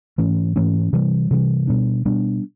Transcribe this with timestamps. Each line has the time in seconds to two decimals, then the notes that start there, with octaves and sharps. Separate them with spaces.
0.18 G#2 E3 A3 C#4
0.56 G#2 E3 A3 C#4
0.93 C3 E3 G3
1.31 C3 E3 G3
1.67 B2 G3 B3 D4
2.05 B2 G3 B3 D4